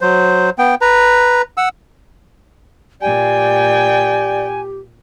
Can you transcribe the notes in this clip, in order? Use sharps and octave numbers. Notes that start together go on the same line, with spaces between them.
F#3 C5
B3 G5
B4 A#5
F#5 E6
A#2 G4 D5 G5 G#5